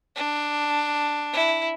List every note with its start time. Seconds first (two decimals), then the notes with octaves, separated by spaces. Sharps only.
0.16 D4
1.33 E4